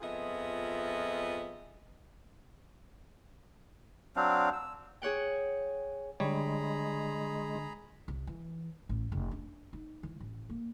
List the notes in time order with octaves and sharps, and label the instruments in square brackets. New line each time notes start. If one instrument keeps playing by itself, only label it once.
[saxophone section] F2 B3 F4 G#4 D#5 E5
[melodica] F#3 C4 D4 F5
E6
[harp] G#4 C#5 F#5 G5
[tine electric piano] D3 D4 [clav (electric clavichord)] G3 C#5 [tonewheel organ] G#3 [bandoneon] G#4 A#5 B5
[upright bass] C2
E3
A1
F1
D4
D#4
E3
A1
A#3